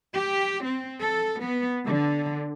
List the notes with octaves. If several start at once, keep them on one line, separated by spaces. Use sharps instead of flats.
G4
C4
A4
B3
D3